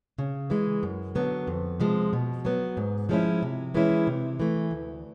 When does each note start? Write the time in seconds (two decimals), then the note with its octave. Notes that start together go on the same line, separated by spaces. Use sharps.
0.18 C#3
0.50 E3 G#3
0.83 F#2
1.15 D3 F#3 B3
1.47 F2
1.80 C3 F3 G#3
2.13 B2
2.45 F#3 B3
2.77 G#2
3.09 F3 G#3 C#4 E4
3.42 C3
3.74 E3 G#3 C#4 E4
4.07 C3
4.40 E3 A3
4.71 D2